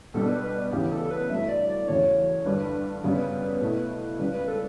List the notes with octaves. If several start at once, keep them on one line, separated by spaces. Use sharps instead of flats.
B2 G3 B3 D4 A4
B4
B4
D2 C#3 E3 B3 G4
A4
B4
G2 F#3 A3 E4 E5
D5
D5
E2 C#3 F#3 A3 C#5
G2 D3 G3 D4 B4
F#2 C#3 G3 B3
B2 A3 E4
C#2 C#3 G3 B4
B4
A4